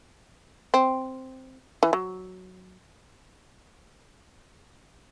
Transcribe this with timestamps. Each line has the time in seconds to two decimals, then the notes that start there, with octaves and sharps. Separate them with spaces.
0.74 C4
1.83 E3
1.93 F#3